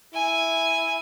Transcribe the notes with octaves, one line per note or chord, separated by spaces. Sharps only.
E4 G#5